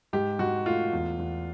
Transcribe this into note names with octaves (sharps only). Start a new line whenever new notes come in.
G#2 G4
G#2 F#4
A3 F4
E2
E2